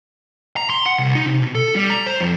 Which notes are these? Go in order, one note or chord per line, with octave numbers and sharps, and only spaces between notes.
A#5
C6
F#5
C2
D#4
C3
B2
A4
G3
A#5
C5
F2